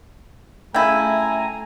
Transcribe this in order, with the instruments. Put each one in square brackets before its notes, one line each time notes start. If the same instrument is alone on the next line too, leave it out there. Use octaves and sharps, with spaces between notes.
[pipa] C#3 E4 [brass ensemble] A3 A#5 [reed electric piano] G5 [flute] G#5